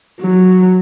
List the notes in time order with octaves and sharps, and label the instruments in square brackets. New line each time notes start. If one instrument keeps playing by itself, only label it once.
[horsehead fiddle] F#3